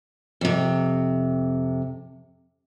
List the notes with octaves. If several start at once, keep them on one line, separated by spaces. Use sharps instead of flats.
F2 C3